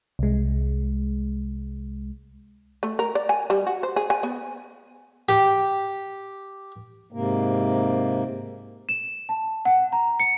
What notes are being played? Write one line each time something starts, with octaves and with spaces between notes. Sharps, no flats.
C2 G#3
A3
A#4
D5
G#5
G3
F#4
C5
G#4
G#5
B3
G4
G#2 C3 A#3
E7
A5
F#5
A#5
C#7